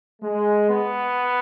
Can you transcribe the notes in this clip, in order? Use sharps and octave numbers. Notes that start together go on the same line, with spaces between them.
G#3
B3